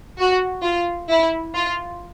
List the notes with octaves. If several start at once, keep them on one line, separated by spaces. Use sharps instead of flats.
F#4
F4
E4
F4